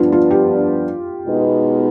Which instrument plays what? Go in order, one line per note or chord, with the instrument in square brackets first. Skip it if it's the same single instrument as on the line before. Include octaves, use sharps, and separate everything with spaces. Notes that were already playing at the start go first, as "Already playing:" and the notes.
Already playing: [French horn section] G2 F3 B3 D4 [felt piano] F4
[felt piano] F4
G4
[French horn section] B2 G#3 B3 D#4